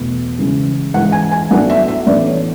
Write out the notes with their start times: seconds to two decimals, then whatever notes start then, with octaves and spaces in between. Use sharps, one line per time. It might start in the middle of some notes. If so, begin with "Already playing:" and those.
Already playing: E2 B2 A3
0.38 C#3 E3 G#3 C#4
0.94 G#2 E3 G#3 F#5
1.12 G#5
1.32 G#5
1.51 A2 F#3 B3 D4 F#5
1.70 E5
1.88 E5
2.07 A2 E3 B3 D4 D5
2.26 C#5